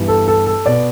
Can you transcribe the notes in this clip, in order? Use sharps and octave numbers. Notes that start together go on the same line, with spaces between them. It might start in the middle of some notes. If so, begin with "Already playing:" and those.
Already playing: G2 E3 B3
A4
A4
A4
B2 B3 D5